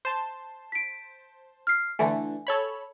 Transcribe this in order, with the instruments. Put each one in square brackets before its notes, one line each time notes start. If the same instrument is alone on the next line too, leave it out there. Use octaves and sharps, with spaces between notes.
[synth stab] C5 A5
[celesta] B6 D7
F6 C7
[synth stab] D3 E3 A3 [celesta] G#5
[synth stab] A4 C#5 B5